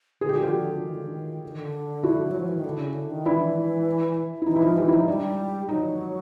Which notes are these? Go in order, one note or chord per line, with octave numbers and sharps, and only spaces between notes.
D3 G#4
G4
F#4
F4 G4
D#3
D3
D#3
D3
D#3
D3
E4 F#4
F#3
F3
E3
D#3
D3
C#3
D3
D#3
E3 D4 E4
E4
E3 D#4
E4
F3 D#4 F4
E3 F4 G4
E4
F3 D#4
G3 D4
F#3 D#4